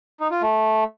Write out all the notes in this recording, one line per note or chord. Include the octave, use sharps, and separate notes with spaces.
D#4
F4
A3